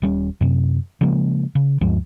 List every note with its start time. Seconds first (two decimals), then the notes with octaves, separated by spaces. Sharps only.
0.02 D#1 G3 C#4
0.41 F#2 C3
1.01 C#3 F3 G#3 A#3
1.55 C#3
1.81 D2 G2 F3 G#3